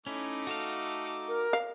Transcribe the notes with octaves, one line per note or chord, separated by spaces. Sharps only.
A3 C#4 D#4 E4 D6
F#4 A4 F5
A#4
F5